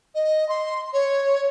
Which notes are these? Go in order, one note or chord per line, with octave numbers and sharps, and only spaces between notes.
D#5
C6
C#5